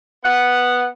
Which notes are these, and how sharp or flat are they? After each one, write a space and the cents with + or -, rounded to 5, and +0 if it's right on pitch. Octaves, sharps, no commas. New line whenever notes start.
B3 +0 F#5 +0